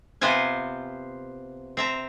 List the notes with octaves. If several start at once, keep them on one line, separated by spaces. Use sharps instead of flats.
C3 B3 C4 F4 C5 G#5
C4 E5 A#5